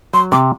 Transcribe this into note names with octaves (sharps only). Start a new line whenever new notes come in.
F#3 C6
C3 D6